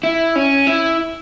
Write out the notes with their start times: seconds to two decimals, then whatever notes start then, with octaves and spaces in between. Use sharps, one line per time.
0.03 E4
0.36 C#4
0.67 E4